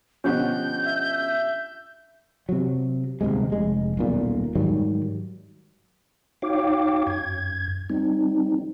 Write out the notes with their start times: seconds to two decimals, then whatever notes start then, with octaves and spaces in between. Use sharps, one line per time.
0.24 B2 D3 F3 C#4 G4 F#5 G6
0.86 E5
2.49 C3 F#3
3.21 D#1 B1 C3 G#3
3.52 F1 G#3
3.97 D#1 B1 A#2
4.55 G#2 D#3 F#3 G3
6.42 D#4 F#4 C#5 F5 G5 D6
7.07 F#2 G#6
7.90 G3 C4 D#4